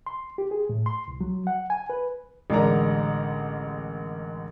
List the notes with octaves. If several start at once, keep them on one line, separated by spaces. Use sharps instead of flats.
C6
G4
G#4
A2
C6
C2
F#3
F#5
G#5
B4
A1 D3 G#3 A#4 D5 A#5